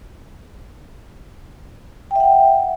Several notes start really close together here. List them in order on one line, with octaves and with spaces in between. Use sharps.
G5 E5 F#5